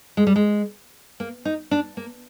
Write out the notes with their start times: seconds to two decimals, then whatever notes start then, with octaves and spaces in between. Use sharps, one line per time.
0.17 G#3
0.27 G3
0.36 G#3
1.20 A#3
1.45 D#4
1.71 D4
1.97 A#3